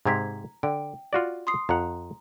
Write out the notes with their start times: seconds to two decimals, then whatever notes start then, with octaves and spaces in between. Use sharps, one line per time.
0.06 G#2 C3 C4 A#5 G#6 B6
0.63 D3 G5
1.13 F4 F#4 D5
1.47 C6 D#6 C7
1.69 F2 F#5 A#5